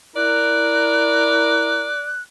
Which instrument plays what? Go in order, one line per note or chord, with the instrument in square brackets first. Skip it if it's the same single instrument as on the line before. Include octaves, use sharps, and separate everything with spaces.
[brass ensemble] E4 A#4 [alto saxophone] D5 [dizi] F#6